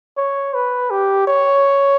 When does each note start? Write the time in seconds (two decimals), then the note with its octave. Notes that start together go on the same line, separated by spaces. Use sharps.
0.17 C#5
0.54 B4
0.90 G4
1.27 C#5